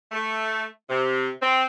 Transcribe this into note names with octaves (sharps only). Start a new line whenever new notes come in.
A3
C3
C4